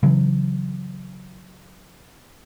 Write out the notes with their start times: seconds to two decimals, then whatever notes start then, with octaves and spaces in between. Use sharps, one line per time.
0.03 C#3 E3 F#3